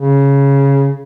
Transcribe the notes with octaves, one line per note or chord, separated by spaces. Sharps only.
C#3